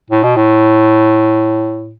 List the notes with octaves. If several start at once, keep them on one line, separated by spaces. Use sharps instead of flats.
A2
B2
A2